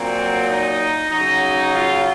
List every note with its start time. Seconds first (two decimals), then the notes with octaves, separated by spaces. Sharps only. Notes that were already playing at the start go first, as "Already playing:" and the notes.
Already playing: A#2 F#3 C4
0.48 D#4
1.10 C#3 F#3 D#4
1.74 F4